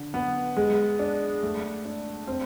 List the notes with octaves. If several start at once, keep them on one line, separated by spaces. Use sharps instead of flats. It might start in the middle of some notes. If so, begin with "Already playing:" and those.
Already playing: D3
B3
G#3
D4
A3
D4
C4